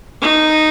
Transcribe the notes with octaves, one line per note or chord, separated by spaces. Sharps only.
D#4